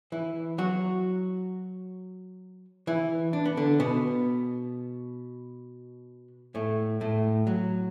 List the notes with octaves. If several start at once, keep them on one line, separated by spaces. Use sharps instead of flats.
E3 E4
F#3 F#4
E3 E4
D4
B3
D3 D4
B2 B3
A2 A3
A2 A3
F#3